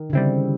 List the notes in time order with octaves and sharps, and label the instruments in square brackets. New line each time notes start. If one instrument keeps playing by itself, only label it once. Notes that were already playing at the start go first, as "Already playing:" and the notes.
Already playing: [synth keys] D#3
[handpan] D3
[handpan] C#3 [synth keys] G3 C4 E4